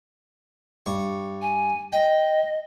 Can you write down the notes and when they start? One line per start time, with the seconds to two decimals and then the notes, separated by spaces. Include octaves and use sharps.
0.86 G2 C#6
1.42 G#5
1.93 D#5 G5